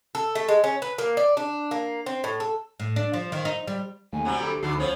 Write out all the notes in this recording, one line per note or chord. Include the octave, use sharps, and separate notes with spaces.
A4
A3
G#3
C#4
B4
A#3
D5
D4
A#3
C4
A2
A4
A2
D4
F3
D#3
D#4
G3
D#2 A3 G#5
C3 F#3 G3 F#5
D2 G4 A4
D2 E3 D#4 F#4 A4 C7
F3 B3 C#4 C5 C#5